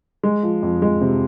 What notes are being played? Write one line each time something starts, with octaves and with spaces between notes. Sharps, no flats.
G#3
F3
F2
G#3
C3